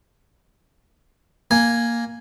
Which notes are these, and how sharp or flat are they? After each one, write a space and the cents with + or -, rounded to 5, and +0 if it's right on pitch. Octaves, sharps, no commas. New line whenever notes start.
A#3 +0 G#5 +0